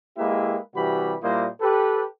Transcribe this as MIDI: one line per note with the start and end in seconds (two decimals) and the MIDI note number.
0.17 0.57 56
0.17 0.57 58
0.17 0.57 64
0.17 0.57 67
0.17 0.57 71
0.17 0.57 76
0.75 1.15 48
0.75 1.15 52
0.75 1.15 55
0.75 1.15 66
0.75 1.15 67
0.75 1.15 83
1.22 1.47 46
1.22 1.47 55
1.22 1.47 58
1.22 1.47 64
1.22 1.47 72
1.22 1.47 75
1.61 2.03 67
1.61 2.03 69
1.61 2.03 71